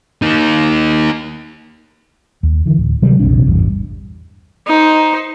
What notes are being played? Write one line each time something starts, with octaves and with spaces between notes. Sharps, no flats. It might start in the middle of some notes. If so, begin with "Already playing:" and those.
A#3 D#4
D#2
D3 E3
D1
C3 D#3 F#3 G3
A#1 E2 C3 D4
A1 E2 G2
D#4 C5